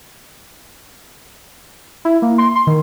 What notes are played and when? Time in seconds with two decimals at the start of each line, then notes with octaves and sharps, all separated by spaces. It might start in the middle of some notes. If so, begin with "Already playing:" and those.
2.05 E4
2.22 A#3
2.38 C6
2.55 C6
2.67 D#3